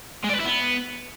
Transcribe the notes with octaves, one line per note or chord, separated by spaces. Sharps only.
G#3
D5
B4
E4
B3